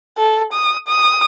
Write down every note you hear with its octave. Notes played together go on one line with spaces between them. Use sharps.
A4
D#6
D#6